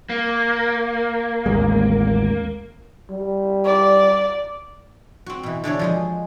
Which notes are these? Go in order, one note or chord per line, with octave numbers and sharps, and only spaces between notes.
A#3
A1 D#2 G#3
G3
D5
C4 F#4
B2 E3
D3 E3 D4 C#5
F3 G#3 D#5